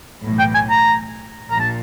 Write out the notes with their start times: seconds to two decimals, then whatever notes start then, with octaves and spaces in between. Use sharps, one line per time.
0.23 B1 A2 E3
0.39 G5
0.55 G#5
0.70 A#5
1.51 A#1 A#2 A#5
1.60 A5